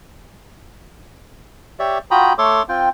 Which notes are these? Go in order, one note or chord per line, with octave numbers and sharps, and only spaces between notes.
G4 C#5 D5 E5
F4 F#4 G5 A#5 B5 D#6
A3 A4 C#5 C6 D6
C4 F4 G5